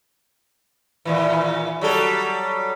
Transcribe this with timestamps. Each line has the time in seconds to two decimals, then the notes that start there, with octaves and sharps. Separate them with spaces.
1.05 D#2 A#2 E3
1.81 F#3 G3 A4